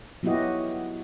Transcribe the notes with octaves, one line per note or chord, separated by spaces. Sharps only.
F#3 B3 E4 F#4 G4 D#5